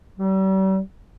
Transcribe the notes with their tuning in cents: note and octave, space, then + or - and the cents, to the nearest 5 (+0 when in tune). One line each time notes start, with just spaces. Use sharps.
G3 -40